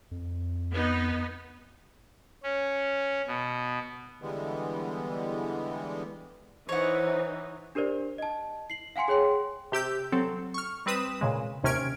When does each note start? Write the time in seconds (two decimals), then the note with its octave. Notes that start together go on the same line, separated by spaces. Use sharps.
0.11 F2
0.72 B3 D#4
2.43 C#4
3.27 B2
4.22 D3 E3 G3 G#3 B3
6.69 E3 D#4 C5 C#5 F#5
7.75 D4 G4 A#4 C5 D5
8.18 D#5 A5
8.70 C7 F#7
8.96 F5 F#5 G#5 C6 C#7
9.08 G#4 C#5 G5 C6
9.72 C3 G4 E6 G6
10.12 F#3 C4 A4
10.54 C#6 F6
10.86 G3 C4 B4 D#6 E7
11.21 A#2 C#3 G#3
11.63 D#2 C3 C#4 F6 G#6 D7